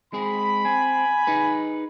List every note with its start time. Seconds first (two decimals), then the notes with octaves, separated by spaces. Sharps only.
0.13 G#3 C4 G#4 B5
0.65 C4 G#5
1.27 D#4 G#4 B4